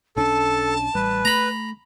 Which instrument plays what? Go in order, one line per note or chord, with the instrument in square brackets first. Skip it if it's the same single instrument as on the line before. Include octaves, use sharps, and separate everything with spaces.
[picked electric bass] B1 C#4 D4 [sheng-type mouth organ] A4 [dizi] A5
[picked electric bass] A1 G3 [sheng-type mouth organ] B4
[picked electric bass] A3 [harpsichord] A#5 B5